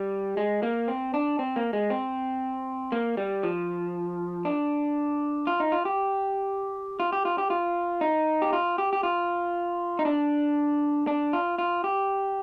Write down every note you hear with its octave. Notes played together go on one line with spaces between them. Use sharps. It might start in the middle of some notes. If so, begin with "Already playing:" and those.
Already playing: G3
G#3
A#3
C4
D4
C4
A#3
G#3
C4
A#3
G3
F3
D4
F4
D#4
F4
G4
F4
G4
F4
G4
F4
D#4
G4
F4
G4
G4
F4
D#4
D4
D4
F4
F4
G4